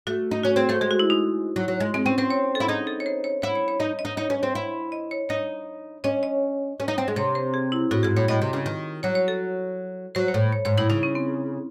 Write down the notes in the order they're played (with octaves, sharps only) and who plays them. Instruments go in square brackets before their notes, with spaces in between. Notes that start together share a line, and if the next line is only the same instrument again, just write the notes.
[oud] A3 [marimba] F#4
[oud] D#4
[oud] C#4 [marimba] F#4
[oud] C4 [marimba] G#4
[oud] A3 [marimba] C5
[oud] G#3 [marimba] G#4
[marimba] F#4
E4
D#4
[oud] F#3
F#3
G#3
[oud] G#3 [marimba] C4
[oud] C4 [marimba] C#4
[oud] C4 [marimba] C5
[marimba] C#5
A4
[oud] E4
[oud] D#4 [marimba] G#4
[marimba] A4
C#5
C5
C#5
[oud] E4 [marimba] C#5
[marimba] C#5
C#5
[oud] D#4 [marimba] D#5
[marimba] D#5
[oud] D#4
[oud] D#4 [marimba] C#5
[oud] C#4
C4
E4
[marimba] D#5
C#5
[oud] D#4 [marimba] C#5
[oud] C#4 [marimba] D#5
[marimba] D#5
[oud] C#4
D#4
C4
G#3
[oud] C3 [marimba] C#5
[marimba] C5
G#4
E4
[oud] A2 [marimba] F#4
[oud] G#2 [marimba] G#4
[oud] A2 [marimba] C#5
[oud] A2 [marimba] D#5
[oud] C3
C#3
D#3
[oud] F#3 [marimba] C#5
[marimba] C#5
A4
[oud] F#3 [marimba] C5
[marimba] C#5
[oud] A2
[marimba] C#5
[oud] G#2 [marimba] C#5
[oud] A2 [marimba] E4
[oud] C#3 [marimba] D#4
[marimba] C#4
C4